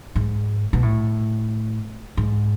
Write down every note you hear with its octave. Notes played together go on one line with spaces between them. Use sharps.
G#2
B2
A2
G#2